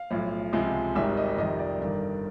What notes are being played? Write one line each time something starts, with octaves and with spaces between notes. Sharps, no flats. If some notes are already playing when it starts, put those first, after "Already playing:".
Already playing: F5
B1 A2 F3
C#2 C3 F3 G#3
G#1 G#2 D#3 G3 E5
D#5
F2 C3 D#3 G3 D#5
D5
G1 G2 D#3